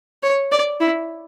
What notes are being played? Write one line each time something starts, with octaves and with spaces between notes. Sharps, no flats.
C#5
D5
E4